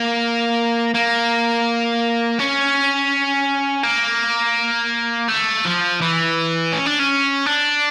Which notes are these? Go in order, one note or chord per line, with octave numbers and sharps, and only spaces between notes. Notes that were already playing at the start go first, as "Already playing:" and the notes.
Already playing: A#3
A#3
C#4
A#3
A3
F3
E3
C#4
D4
C#4
D4